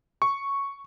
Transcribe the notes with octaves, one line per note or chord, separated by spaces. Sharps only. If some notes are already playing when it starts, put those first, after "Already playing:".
C#6